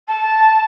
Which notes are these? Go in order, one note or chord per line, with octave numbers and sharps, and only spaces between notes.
A5